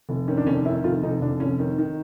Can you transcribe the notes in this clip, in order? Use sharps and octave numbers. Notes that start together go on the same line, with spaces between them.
F1
D#3 C#4
D4
F1 C#4
D#3 E4
F1 F4
F1 D#4
F1 D4
F1 C#4
D#3
D#3